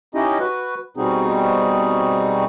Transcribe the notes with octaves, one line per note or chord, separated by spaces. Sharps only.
C#4 D#4 E4 G4 D#5
F#4 B4
B2 G3 C4 D#4 F#4 G#4